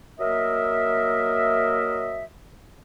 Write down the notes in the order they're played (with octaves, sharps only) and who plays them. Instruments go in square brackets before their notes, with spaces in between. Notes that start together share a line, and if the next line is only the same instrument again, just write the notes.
[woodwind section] F#3 A#3 A#4 D#5 E5